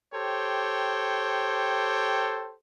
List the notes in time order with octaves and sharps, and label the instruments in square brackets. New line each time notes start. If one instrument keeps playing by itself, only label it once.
[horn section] G4 A4 C5 C#5 G5